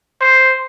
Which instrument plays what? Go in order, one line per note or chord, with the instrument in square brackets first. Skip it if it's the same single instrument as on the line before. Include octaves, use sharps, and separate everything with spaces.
[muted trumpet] C5